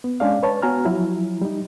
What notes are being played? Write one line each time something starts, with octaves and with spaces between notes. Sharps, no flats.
B3
G#3 C#4 D4 G#4 D5 F5
B4 C#5 A5
B3 F#4 G#5 A#5 F6
F3 F#3 E4
G3 D#4